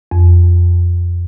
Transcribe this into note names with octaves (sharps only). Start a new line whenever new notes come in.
F2